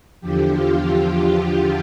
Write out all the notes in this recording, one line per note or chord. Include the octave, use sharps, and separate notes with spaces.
E2 D3 F3 G4
F4
G4
G4